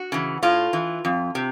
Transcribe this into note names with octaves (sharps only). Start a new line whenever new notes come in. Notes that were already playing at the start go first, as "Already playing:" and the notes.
Already playing: F#4
C#3 E3
A2 F4
E3
F2
C3